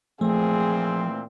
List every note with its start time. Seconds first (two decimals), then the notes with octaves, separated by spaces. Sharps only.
0.21 A#2 E3 F3 A3 C4 G#4